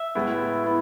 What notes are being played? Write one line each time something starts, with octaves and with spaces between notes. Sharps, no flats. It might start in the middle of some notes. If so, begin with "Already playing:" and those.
Already playing: E5
A2 G#3 B3 E4
B3 E4